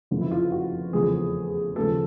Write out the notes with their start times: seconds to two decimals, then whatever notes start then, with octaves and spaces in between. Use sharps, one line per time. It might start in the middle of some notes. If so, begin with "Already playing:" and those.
0.11 F#1 F2 D3 F3
0.21 E4
0.31 F4
0.52 F#4
0.93 F1 E2 C#3 F3 G#4
1.76 D#2 C#3 F3 A4